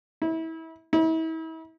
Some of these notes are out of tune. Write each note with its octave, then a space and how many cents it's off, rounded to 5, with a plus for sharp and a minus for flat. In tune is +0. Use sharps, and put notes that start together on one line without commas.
E4 -30
E4 -40